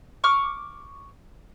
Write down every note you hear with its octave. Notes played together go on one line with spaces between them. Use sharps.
C#6 D6 F6